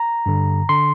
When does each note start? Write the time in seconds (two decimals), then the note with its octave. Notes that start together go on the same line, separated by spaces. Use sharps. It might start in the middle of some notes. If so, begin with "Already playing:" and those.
Already playing: A#5
0.26 G2 D3
0.69 D3 C6